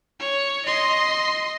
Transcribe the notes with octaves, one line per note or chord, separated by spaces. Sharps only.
C#5
D#5 C6